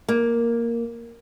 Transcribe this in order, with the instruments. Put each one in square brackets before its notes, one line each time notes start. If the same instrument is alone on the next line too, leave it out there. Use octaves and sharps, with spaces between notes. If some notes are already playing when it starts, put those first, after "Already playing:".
[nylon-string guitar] A#3